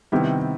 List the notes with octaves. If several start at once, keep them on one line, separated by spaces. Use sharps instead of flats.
C3 D#3 G3 B3 E4